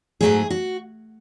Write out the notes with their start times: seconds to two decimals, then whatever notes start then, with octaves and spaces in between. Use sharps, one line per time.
0.21 G#2 F#3 A3 D#4 G#4
0.50 F#4